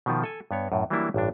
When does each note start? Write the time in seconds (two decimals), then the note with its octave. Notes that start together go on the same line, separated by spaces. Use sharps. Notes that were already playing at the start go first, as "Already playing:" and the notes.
0.06 B2 D#3 F3
0.23 A4 G#5
0.51 G2 B3 C#5
0.72 F#2 A2
0.90 E3 F#3 G3 A#3 D4 E4
1.14 A1 G2 D4